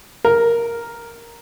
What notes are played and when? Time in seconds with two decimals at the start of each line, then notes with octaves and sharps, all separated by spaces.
0.25 A#4